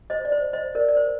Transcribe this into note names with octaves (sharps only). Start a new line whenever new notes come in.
C5 D#5
D5
C5
C5 D#5
A#4 D5
D5
C5